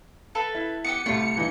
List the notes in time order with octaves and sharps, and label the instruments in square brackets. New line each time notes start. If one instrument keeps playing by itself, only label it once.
[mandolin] A4 B4 F5
[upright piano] E4
[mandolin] B3 D#4 G4 [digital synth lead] C#7
[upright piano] C2 G3 A3 [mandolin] F4
[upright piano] G2 E3 D#4